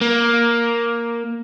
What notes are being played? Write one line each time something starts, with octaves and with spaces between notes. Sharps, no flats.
A#3